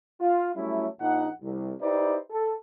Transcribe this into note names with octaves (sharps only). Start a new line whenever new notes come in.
F4 F5
F#3 G3 A3 C#4 E4
A#1 D#4 F#5
C2
D#4 E4 G4 B4 C5 D5
A4